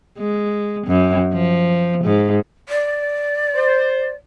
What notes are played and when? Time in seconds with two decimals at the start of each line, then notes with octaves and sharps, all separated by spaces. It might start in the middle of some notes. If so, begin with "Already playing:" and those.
0.18 G#3
0.87 F#2
1.33 F3
2.04 G#2
2.69 D5
3.54 C5